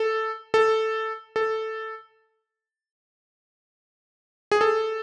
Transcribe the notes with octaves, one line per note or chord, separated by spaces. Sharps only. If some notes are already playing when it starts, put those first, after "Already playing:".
Already playing: A4
A4
A4
G#4
A4